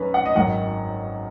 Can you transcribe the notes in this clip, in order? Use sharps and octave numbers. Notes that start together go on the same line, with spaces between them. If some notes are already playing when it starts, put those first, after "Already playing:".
Already playing: F#2 C#4 B4 C#5
F#5
D#5
G#1 F#2 D#3 F#5